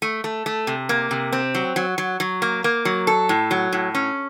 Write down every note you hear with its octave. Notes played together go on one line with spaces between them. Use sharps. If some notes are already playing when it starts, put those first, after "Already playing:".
A3
A3
A3
C3
A#3
C3
C4
F#3
F#3
F#3
F#3
A#3
A#3
F#3
A4
A2
F#3
A2
C#4